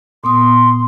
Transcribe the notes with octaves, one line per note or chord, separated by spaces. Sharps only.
A#2 B3 C6 D#6